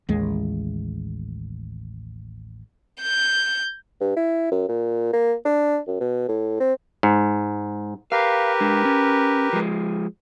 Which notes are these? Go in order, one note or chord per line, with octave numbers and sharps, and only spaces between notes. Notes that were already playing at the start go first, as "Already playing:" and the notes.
A1 D#2 G#3
G6
G2
E4
F#2
A#2
A#3
D4
F#2
B2
A2
C4
G#2
G4 A#4 B4 F5
G#3 D4
C#4
F3 G#3